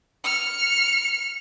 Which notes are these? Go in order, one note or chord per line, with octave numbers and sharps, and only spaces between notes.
F6 C#7